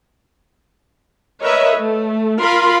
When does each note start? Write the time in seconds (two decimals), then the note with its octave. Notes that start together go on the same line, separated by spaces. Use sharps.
1.40 A#4 B4 C#5 D#5 E5
1.75 A3
2.38 F4 A#4 B5 C6